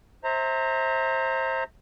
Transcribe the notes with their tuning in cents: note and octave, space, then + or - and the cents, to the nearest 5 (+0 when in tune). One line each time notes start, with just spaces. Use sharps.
C5 +20 E5 -35 A#5 -20